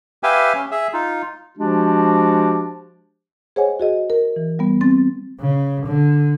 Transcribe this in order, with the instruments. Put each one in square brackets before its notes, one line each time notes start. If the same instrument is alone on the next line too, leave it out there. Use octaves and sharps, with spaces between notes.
[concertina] G4 B4 E5 F5 G5 G#5
C#4
G#4 E5
D#4 F4
[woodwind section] F3 G#3 D4 F#4 G4
[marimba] G#4 C5 C#5 D#5 F#5 G#5
F#4 G#4 D#5
A#4
E3
G3 B3
C4 A6
[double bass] C#3
D3